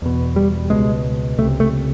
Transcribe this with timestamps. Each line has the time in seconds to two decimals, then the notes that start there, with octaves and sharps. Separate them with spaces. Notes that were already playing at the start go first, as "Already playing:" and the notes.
0.02 E2 B2
0.36 G3
0.70 C#2 B2 G#3
1.38 C#2 A3
1.42 C3
1.60 A3